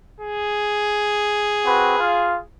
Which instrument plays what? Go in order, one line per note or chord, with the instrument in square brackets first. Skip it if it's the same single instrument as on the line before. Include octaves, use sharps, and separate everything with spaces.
[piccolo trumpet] G#4
[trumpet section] C4 F#4 B4
F4 F5